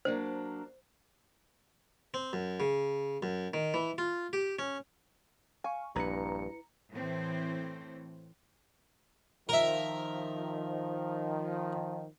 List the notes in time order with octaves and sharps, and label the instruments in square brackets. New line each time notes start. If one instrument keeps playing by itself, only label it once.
[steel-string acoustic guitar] F#3 A#3 D4 [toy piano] C5
[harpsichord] C4
F#2
C#3
F#2
D#3
E3
F4
G4
C#4
[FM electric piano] F5 C#6 [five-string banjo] G#5
[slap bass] A#1 [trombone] G2 [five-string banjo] E4 B4 [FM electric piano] A#5 C#7
[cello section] A2 E3 C4
[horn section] D#3 F3 [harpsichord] A#4 E5